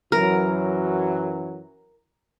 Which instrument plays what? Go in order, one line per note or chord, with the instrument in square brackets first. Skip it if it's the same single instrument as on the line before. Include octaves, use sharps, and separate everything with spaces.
[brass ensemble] F#2 E3 F#3 [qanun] A#4